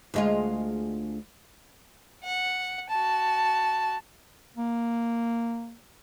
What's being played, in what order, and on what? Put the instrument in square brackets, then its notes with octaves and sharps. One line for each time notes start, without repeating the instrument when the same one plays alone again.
[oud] D2 G#3 F4
[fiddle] F#5
F#4 A5
[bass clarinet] A#3